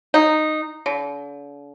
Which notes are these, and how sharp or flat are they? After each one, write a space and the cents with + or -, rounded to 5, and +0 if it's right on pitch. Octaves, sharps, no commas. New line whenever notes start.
D#4 -10
D3 -45